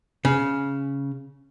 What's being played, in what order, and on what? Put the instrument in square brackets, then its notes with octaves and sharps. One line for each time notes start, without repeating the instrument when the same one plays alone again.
[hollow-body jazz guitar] C#3